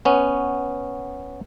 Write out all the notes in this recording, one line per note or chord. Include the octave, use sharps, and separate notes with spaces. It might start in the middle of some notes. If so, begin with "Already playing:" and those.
B3 C#4